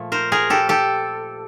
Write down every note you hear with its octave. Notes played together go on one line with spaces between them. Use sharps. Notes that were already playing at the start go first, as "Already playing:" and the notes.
Already playing: A#2 F3 A3
A#4 C5
G#4 A#4
G4 A4
G4 A4